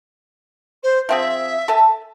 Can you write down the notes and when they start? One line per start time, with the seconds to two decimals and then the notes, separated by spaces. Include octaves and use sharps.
0.83 C5
1.09 F3 C4 G#4 E5
1.68 A4 G#5 A5